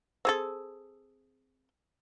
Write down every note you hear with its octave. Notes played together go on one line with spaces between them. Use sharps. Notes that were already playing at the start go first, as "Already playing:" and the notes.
C4 G#4 A4